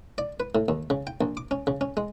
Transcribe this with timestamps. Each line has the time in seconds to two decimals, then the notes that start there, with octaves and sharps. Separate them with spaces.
0.18 D5
0.40 B4
0.55 A2
0.68 D#2
0.90 C#3
1.07 G5
1.21 A#1
1.37 D6
1.51 C#4
1.67 C#3
1.81 C#4
1.97 G#3